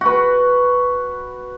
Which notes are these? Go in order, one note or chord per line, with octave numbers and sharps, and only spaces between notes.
F#4 B4